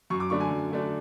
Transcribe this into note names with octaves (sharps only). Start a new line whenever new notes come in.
F#2 C#6
D6
D3 A3 D4 C#6
G#5
F#2
D3 A3 D4